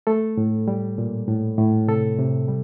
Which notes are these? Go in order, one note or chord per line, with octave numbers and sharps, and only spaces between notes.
A3 A4
A2
G3
A#2
A2
A2
C3 A4
C3
G3